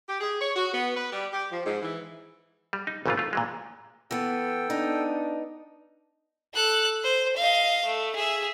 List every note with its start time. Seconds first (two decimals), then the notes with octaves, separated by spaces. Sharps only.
0.09 G4
0.21 G#4
0.41 C#5
0.56 F#4
0.73 B3
0.96 B4
1.12 G3
1.33 G4
1.51 F3
1.66 G#2
1.83 E3
2.73 G3
2.87 D#4
3.06 G#1 A#2 C#3 E3 B3 F4
3.18 A3 F4
3.33 A#2 E3 G#3
4.11 E3 B3 A4 G5
4.70 B3 D4 D#4
6.54 A4 F#6
7.04 C5
7.36 D#5 F5
7.85 A3
8.15 G#4 E5